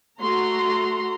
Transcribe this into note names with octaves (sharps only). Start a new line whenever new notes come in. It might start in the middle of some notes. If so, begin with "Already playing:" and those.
A3 F#4 A#5 C6